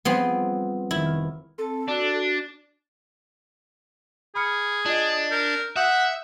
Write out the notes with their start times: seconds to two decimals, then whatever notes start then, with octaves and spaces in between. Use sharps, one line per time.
0.05 F3 G3 B3 C4 D4 G#4
0.91 F1 D#3 E4
1.06 F6
1.58 C4 A4 A5
1.89 D4 F#4
4.35 G#4 B5 F6 C#7
4.86 D4 F4 D#5
5.31 A#4 G6
5.76 E5 F#5 D#6 G6